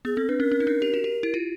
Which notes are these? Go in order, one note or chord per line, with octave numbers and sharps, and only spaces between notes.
B3 G#4
C4 A4
D4 B4
C#4 A#4
C#4
D#4
D4
G4
F#4
G4
E4
F4